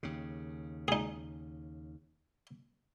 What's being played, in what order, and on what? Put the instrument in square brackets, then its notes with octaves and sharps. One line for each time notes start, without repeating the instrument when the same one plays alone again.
[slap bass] D#2 C#3
[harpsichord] D#4 G#4